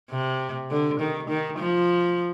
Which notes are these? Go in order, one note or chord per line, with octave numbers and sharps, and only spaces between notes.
C3
D3
D#3
D#3
F3